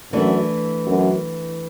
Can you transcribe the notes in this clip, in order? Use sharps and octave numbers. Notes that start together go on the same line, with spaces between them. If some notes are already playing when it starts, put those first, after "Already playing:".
F#2 E3 A3 D4
F#2